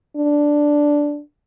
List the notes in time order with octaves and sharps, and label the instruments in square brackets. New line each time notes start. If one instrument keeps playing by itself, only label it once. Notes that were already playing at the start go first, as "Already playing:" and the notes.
[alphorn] D4